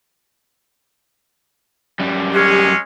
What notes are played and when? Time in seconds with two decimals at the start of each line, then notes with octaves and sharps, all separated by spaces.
2.00 F#2 G3
2.34 G#3 C#4 G4